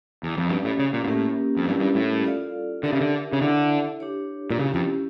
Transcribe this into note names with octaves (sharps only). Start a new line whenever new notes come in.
E2
F2
G2 C#4 G4 D5
A2
C#3
A#2
A#2
A2 A#3 C#4 G4 A#4
F2
G2 G3 C#4 E4 G4 A#4
G2
A2
F4 A4 D5 F5
D3 D4 G4 A#4 E5
C#3
D3
C#3
D3 E4 A4 E5
D4 G4 C#5
A#2
C#3 C#4 E4 G4
F2